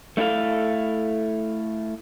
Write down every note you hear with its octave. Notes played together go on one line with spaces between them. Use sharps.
A3 D#4 E4 A4 F5